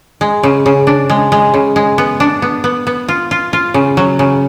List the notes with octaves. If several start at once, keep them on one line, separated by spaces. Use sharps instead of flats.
G#3
C#3
C#3
D4
G#3
G#3
C#3
G#3
B3
D4
B3
B3
B3
F4
F4
F4
C#3
F#3
C#3